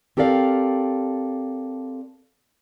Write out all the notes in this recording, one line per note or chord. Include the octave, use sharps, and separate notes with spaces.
C4 G4 A4 A#4 D5 F5